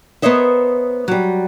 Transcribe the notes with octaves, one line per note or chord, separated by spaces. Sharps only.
B3 A#4 C5 C#5 D#5 E5
F#3 G3